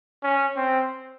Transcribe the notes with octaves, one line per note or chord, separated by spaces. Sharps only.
C#4
C4